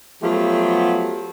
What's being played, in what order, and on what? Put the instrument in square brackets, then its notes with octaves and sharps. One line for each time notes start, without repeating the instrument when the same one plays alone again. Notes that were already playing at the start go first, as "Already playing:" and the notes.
[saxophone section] F3 F#3 A3 B3 F4 G4